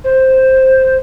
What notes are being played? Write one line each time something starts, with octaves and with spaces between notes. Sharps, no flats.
C5